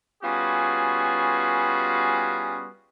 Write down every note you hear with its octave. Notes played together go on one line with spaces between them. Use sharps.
G3 B3 C#4 F4 F#4 G#4